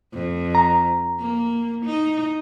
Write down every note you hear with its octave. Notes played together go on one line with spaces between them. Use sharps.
F2
A#5
A#3
D#4